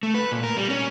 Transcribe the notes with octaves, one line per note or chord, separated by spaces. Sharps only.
A3
B4
A#2
A#4
G3
C#4